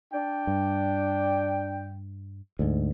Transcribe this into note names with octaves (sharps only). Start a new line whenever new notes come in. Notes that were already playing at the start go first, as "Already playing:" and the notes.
D4 G5
G2
D2 G#2